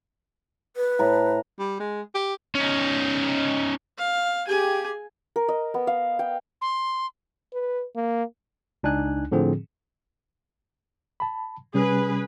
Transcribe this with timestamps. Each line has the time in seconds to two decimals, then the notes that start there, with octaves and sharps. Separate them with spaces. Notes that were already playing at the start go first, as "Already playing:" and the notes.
0.77 B4
0.99 A2 A#5
1.59 G3
1.80 G#3
2.15 G4
2.55 C#4 D#4
3.98 F5
4.47 G4 G#4 G#5
5.36 A#4
5.48 D#5
5.74 B3
5.87 F5
6.19 G5
6.62 C6
7.53 B4
7.96 A#3
8.83 C#2 D4 D#4 G#5 F#6
9.32 A2 D3 F3 C4 G#4
11.20 A5 B5
11.74 C3 G3 C#4 G#4 B4